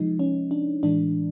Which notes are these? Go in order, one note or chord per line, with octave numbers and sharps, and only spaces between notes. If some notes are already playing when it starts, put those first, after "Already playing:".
Already playing: C3 F3 G#3 D#4
C#4
D4
A2 E3 G#3 D4